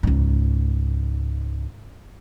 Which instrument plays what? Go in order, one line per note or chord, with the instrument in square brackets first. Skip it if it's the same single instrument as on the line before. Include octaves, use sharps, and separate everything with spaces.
[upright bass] C#2 G#2